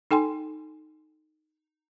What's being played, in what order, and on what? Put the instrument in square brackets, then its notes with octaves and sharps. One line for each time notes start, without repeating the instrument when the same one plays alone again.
[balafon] D#4 A4 G5 G#5 C6